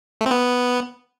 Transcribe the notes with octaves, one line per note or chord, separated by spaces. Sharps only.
A3
C4
B3